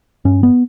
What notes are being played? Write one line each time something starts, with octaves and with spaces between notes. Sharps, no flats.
G2 C#4
B3